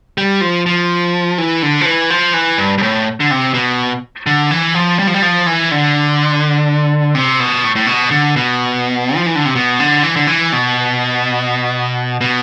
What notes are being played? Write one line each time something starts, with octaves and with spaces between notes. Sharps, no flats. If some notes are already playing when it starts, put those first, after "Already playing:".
G3
F3
F3
E3
D3
F3
E3
F3
E3
G2
G2
A2
D3
C3
B2
D3
E3
F3
G3
F3
G3
F3
E3
D3
C3
B2
A2
A2
B2
D3
B2
F3
E3
D3
C3
B2
D3
E3
D3
E3
B2
B2